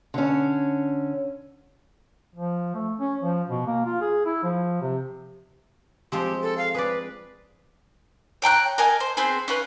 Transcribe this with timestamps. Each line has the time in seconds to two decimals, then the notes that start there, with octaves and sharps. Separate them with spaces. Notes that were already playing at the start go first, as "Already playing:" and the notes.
0.14 D3 C#4
2.35 F3
2.75 A3
2.99 C#4
3.21 F3
3.49 B2
3.66 A#3
3.85 F4
4.01 G#4
4.26 E4
4.43 F3
4.82 C3
6.12 F3 G#3 C4 G4
6.42 A4
6.58 F5
6.75 G#4 B4 D5
8.42 C#5 G5 A#5 F#6
8.78 A#4 D#5 G#5 A5
9.00 C5
9.17 B3 C4 G#4 C5
9.48 C#4 F4 B4